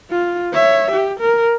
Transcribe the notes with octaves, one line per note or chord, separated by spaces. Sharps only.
F4
C#5 E5
G4
A#4